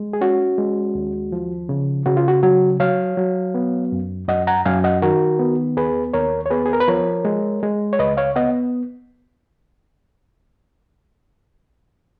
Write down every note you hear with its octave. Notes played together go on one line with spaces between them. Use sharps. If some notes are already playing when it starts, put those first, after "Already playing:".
Already playing: G#3
G#4
C#4 F#4
G#3
D#2
F3
C#3
C#3 F#4
F4
F#4
F#3 F#4
F#3 C#5 F5
F#3
B3
F#2
F#2 D#5 F#5
F#5 A#5
F#2 F5 G#5
D#5 F#5
D#3 F#4 A#4
B3
D#2 G#4 B4
D#2 A#4 C#5
C#5
B3 G#4 B4
G#4
A#4
B4
F3 A#4 C#5
G#3
G#3
C#5
C#2 B4 D#5
C#5 F5
B3 D#5 F#5